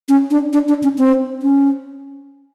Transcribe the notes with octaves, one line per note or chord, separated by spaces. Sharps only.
C#4
D4
D4
D4
C#4
C4
C#4